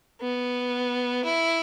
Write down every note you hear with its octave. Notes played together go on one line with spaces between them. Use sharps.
B3
E4